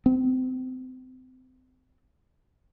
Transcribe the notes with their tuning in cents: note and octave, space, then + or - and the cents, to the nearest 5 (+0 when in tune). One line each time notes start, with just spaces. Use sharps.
C4 -30